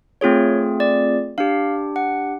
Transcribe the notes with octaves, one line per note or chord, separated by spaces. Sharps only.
A3 C4 F4 G#4 C#5
D5
D4 G4 F5
F#5